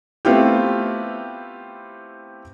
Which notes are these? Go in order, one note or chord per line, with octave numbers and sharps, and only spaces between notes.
A3 B3 C4 E4 F4 G4